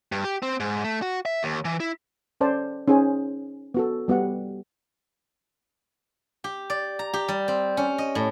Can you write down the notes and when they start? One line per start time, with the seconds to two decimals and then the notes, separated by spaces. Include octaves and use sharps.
0.12 G2
0.24 G4
0.43 C4
0.60 G#2
0.84 A3
1.02 F#4
1.25 E5
1.43 D#2
1.65 E3
1.80 E4
2.41 C#4 A4 C5 D5 A5
2.88 C#4 D#4 G#4 C5 G#5
3.74 B3 F#4 A4
4.08 G3 B3 G4 F#5
6.44 G4
6.70 D5
6.99 A#5
7.13 G4
7.28 G3
7.48 C4
7.77 C#4
7.98 D#5
8.15 A2